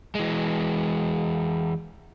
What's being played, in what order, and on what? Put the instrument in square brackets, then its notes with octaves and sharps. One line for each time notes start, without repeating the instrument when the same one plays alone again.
[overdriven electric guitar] E3 G#3